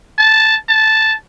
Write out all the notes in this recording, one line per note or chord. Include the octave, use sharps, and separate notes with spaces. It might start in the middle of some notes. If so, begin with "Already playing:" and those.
A5
A5